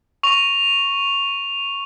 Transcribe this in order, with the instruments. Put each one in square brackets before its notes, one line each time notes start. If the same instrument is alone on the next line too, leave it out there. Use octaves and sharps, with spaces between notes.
[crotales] C#6 F7